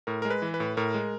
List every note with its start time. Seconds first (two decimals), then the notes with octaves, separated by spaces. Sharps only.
0.07 A2 A#4
0.22 G#3 A#4
0.30 B4
0.42 E3
0.54 B4
0.60 A2
0.77 A2 A#4
0.94 G#3